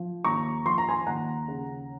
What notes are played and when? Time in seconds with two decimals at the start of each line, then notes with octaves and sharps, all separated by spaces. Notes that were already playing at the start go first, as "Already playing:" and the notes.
Already playing: F3
0.24 D#2 A#5 C#6
0.65 F3 C6
0.78 A#5
0.89 G#5 C6
1.07 D#2 F#5 A#5
1.48 C#3